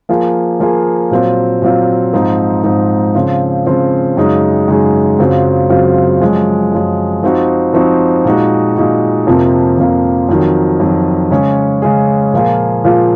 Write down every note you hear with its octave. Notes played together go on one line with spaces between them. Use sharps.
F3 A#3 F4 G#4
F3 A#3 F4 G#4
A#2 F#3 C4 F4
A#2 F#3 C4 F4
G#2 F3 C4 D#4
G#2 F3 C4 D#4
C#3 F3 C4 F4
C#3 F3 C4 F4
F#2 C#3 G#3 D#4 G#4
F#2 C#3 G#3 D#4 G#4
F#2 C#3 F#3 C4 F4
F#2 C#3 F#3 C4 F4
F#2 F3 G#3
F#2 F3 G#3
F3 C4 D#4 F#4
F3 C4 D#4 F#4
A#2 G#3 D#4 F#4
A#2 G#3 D#4 F#4
F2 C3 F3 A#3 F4
F2 C3 F3 A#3 F4
F2 D#3 F#3
F2 D#3 F#3
C#3 G#3 C#4 G#4
C#3 G#3 C#4 G#4
A#2 F3 A#3 F4 G#4
A#2 F3 A#3 F4 G#4